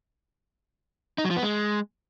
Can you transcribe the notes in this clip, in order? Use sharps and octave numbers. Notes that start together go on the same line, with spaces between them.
D#4
F#3
F3
B3
G#3